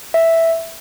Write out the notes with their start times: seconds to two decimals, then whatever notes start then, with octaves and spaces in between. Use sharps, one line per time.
0.14 E5